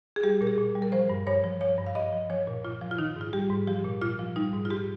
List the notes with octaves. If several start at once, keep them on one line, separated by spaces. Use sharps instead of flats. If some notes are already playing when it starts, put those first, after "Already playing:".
G#4
G3 G4
A#2 A#4
G#4
A#2
G3
A#4
F3 C5
G2
G2 C#5
F3
F3 C#5
G2
F5
G2 D#5
F3
F3 C#5
A#2
A#2 F4
F3
F4
D#3 D#4
G#2 F4
G3 G4
G#2
F3 G4
A#2
A#2 F4
F3
G3 D#4
G#2
F4
G#2 G4